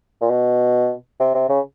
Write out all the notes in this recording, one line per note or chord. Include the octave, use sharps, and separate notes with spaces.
A#2
B2
C3
C3
C#3